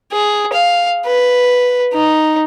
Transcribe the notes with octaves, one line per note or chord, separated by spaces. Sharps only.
G#4
F5
B4
D#4